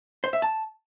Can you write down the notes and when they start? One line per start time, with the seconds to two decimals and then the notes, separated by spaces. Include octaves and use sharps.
0.24 C5
0.33 E5
0.42 A5